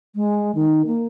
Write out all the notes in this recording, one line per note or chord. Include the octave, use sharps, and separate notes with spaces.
G#3
D#3
A#3